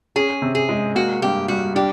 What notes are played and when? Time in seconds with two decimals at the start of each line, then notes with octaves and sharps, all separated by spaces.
0.16 C#4 G#4
0.42 C3
0.55 G#4
0.69 G#3
0.95 A#3 F#4
1.22 G2 G4
1.48 G3 F#4
1.75 D4 G4